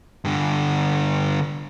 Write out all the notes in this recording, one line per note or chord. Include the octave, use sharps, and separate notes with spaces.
G2 D3